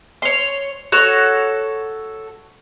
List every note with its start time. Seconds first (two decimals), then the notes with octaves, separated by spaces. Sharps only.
0.22 C#5 C6
0.92 F#4 A4 C#5